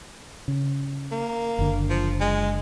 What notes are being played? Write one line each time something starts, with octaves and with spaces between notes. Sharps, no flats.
C#3
A#3
F#1 D3
F3
G#3